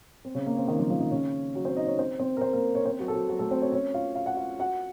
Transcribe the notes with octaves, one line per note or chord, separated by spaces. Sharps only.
C4
C#3 C#4
A#3
C4
D#3 D#4
F3 F4
F3 F4
D#3 D#4
C#3 C#4
F#3 F#4
C4 C5
D#4 D#5
C#4 C#5
C4 C5
C4 C5
A#4
C4 C5
A#3 A#4
C#4 C#5
C4 C5
F#3 F#4
A4
F#3 F#4
F#3 F#4
A3 A4
C4 C5
C#4 C#5
C#4 C#5
F4 F5
F5
F#5
F4 F5
F#4 F#5